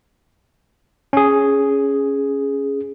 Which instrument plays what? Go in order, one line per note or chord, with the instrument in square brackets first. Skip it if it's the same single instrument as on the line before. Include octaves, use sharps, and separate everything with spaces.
[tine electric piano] C#4 G#4